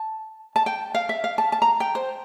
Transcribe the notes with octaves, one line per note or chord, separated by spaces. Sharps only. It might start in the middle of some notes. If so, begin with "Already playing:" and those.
Already playing: A5
A5
G5
F5
E5
F5
A5
A5
A#5
G5
C5